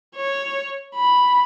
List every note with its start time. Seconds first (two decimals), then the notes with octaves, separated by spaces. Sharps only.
0.16 C#5
0.96 B5